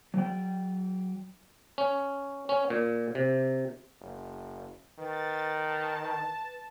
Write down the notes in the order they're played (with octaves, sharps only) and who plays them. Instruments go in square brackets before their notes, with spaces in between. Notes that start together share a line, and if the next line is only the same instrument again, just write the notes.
[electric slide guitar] F#3 G5
[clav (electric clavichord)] C#4
C#4
A#2
C3
[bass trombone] F#1
[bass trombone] D#3 [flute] B4 [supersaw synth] A6
[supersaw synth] A5